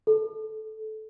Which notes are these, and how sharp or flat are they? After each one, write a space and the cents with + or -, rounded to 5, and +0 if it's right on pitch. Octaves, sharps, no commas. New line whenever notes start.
A4 -15